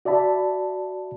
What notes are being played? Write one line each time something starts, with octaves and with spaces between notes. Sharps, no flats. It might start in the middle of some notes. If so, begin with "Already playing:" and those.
F#4 D5 E5 A5 B5